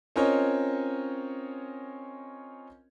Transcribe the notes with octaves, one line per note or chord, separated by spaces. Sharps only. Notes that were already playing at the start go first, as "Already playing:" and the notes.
C4 C#4 F4 A#4 C#5 D#5